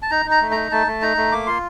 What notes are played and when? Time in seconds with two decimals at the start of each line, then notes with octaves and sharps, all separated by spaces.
0.02 A5
0.11 D#4 A#5
0.26 D#4
0.31 A#5
0.42 A3
0.51 D#4 A#5
0.72 A3 A5
0.87 A3
1.02 D#4 A#5
1.17 A3
1.32 A#3 D6
1.47 F4 C6